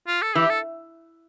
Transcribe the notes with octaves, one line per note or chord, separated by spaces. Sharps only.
F4
A4
E3 G4
A4